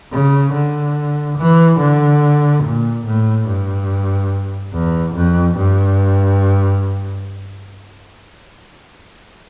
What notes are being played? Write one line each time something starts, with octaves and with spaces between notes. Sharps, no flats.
C#3
D3
E3
D3
A#2
A2
G2
E2
F2
G2